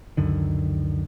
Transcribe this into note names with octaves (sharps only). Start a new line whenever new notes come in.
C#2 F#2 D3 D#3